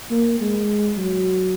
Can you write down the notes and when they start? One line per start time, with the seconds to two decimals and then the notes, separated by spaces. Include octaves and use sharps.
0.11 A#3
0.40 G#3
0.97 F#3